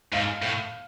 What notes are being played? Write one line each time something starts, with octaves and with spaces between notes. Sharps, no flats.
G#2 F5
A2